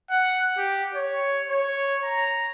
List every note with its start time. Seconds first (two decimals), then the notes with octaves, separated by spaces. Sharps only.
0.10 F#5
0.58 G4
0.95 C#5
1.49 C#5
2.05 A#5